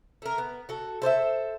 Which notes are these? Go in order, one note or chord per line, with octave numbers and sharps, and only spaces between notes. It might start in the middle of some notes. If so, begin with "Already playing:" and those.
A3 A#4
B3
F#4 A4
A4 C5 D5 E5